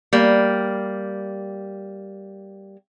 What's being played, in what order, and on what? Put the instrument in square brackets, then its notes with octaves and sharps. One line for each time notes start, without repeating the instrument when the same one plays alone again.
[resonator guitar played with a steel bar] G3 A#3